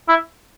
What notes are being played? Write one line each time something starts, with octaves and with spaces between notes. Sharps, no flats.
E4